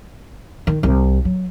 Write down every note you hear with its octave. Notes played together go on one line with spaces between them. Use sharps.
D#3
C2
F#3